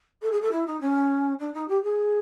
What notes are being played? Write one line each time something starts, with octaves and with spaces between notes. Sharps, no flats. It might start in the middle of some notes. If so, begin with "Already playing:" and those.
A4
G#4
A4
E4
D#4
C#4
D4
D#4
G4
G#4